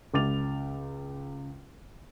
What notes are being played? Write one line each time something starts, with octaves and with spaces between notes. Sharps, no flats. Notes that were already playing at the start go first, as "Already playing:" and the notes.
C#2 D6 A6 F7